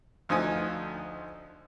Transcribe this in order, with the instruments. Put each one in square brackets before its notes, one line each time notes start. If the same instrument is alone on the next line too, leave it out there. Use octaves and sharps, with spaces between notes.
[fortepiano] D2 F3 D#4 F4 G#5 D#6